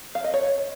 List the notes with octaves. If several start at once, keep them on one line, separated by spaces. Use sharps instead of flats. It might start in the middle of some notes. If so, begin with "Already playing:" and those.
F5
D#5
C#5